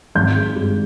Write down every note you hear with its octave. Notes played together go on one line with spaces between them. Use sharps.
G#1 G6
G#3
G2